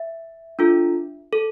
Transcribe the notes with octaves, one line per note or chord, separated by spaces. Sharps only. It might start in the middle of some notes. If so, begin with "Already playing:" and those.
Already playing: E5
D4 F4 A4
A4